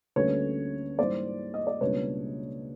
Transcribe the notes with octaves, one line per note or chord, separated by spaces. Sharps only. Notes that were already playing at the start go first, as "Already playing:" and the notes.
D2 D3 G3 A#3 C#4 B4 C#5
G#2 E3 G3 A#3 C5 D5
D#5
D5
C#2 B2 G3 A#3 D4 B4 C#5